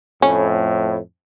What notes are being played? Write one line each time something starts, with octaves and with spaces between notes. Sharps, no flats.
F2 A2 C#4